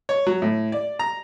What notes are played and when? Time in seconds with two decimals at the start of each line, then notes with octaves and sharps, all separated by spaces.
0.09 C#5
0.27 F#3
0.42 A2
0.72 D5
0.99 A#5